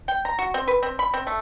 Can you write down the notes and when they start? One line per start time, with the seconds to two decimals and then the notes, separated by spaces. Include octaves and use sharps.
0.08 G5
0.25 A#5
0.39 F#4
0.54 C4
0.68 B4
0.83 C4
0.99 B5
1.14 C4
1.27 A3